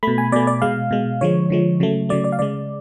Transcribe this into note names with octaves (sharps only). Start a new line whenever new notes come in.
B2 A3 B5
G#5
B2 A3 D5
D5
B2 G#3 F5
B2 G#3
D3 F3 G#3 C#5
D3 F3 G#3
C#3 F#3 A3
C#3 F#3 A3 D5
D5
F5
C#3 G#3 D5